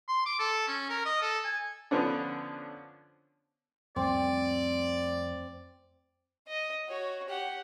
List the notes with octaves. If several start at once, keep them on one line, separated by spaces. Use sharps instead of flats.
C6
D6
A4
C#4
A#4
D#5
A4
G#5
D3 F3 B3 C#4 D4
F2 G3 A3 C4 D5
D#5
F#4 C#5
G4 F#5